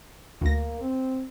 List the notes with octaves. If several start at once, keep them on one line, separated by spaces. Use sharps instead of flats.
D2 A#3 A#6
C4